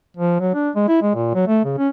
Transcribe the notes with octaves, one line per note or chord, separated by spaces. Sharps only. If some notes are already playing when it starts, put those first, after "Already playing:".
F3
F#3
D4
G#3
E4
G#3
A#2
F#3
A3
C#3
C#4